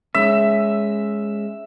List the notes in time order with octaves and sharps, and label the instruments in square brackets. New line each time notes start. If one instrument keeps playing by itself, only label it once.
[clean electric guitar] G#3 C#4 [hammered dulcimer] E5